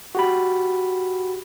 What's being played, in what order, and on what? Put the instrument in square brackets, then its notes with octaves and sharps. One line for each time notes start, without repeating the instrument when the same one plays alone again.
[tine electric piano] F#4 G4 B5